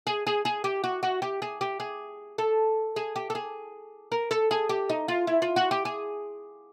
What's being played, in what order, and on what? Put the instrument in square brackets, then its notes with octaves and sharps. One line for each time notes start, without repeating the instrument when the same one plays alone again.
[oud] G#4
G#4
G#4
G4
F#4
F#4
G4
G#4
G4
G#4
A4
G#4
G4
A4
G#4
A#4
A4
G#4
G4
D#4
F4
E4
F4
F#4
G4
G#4